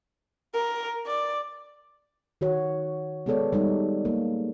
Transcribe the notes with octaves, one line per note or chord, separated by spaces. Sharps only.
A#4
D5
D#3 F#4 C#5
G#3 B3 G#4 A4 C#5 D5
G3 G#3 D#4
A#3